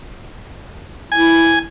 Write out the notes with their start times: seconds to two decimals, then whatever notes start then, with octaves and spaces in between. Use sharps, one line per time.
1.12 E4 G#5